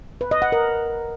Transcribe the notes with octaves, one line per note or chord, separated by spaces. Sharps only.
B4
D#5
F#5
A#4